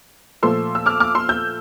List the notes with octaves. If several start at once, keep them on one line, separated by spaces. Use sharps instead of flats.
A#2 F3 A3 C6 E6
E6
D6 F6
D6 F6
C6 E6
E6 G6